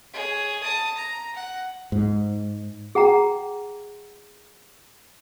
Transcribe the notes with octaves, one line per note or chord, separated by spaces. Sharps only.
G#4 C#5
A5 D#6
A#5
F#5
G#2
G#4 F#5 G5 A#5